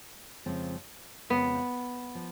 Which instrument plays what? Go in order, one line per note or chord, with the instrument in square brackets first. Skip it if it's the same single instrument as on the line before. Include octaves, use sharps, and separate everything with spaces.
[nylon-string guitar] F2 C#3 F3 G#3 C4
[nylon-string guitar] F2 C#3 F3 G#3 C4 [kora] B3
[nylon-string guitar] F3